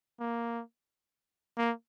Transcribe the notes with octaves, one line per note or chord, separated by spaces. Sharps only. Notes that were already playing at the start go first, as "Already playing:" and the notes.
A#3
A#3